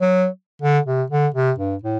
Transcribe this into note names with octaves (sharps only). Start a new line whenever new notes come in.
F#3
D3
C3
D3
C3
G2
A2